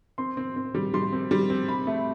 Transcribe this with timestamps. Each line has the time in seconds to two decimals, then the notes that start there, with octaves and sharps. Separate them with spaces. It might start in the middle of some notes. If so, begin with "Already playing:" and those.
0.18 C4 C6
0.37 C4
0.56 C4
0.75 G3
0.94 G3 C6
1.13 C4
1.31 G3
1.50 C4
1.69 C3 B5
1.87 A3